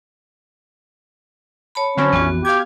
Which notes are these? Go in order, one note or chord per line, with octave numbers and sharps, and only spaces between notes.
C#5 A5 B5
D3 F#3 C4 C#4
A#1 F2 E3 B3 F#4
G4 F5 G#6